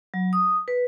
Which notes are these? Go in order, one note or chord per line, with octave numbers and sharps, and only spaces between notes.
F#3
D#6
B4